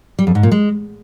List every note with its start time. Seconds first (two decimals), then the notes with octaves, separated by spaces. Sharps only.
0.19 G3
0.27 F2
0.35 G#2
0.43 A#2
0.52 G#3